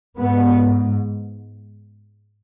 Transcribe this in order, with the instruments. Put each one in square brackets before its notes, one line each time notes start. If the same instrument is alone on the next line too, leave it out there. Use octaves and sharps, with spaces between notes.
[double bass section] G#2 B3